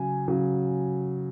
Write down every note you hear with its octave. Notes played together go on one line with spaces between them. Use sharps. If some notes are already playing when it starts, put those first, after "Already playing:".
Already playing: C#3 F#3 G#5
C#3 F#3